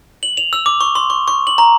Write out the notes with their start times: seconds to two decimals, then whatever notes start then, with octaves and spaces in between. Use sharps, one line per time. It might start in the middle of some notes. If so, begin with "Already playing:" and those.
0.23 F#7
0.37 F7
0.53 E6
0.66 D6
0.81 C#6
0.95 C6
1.10 C#6
1.28 C#6
1.47 F#7
1.58 A#5